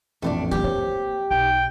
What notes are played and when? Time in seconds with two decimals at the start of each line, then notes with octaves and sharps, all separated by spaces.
0.22 A1 F2 A#2 A3 B3 D4
0.51 E3 G3 G4
0.64 A#3 C5 C#5
1.31 B1 D#4 G5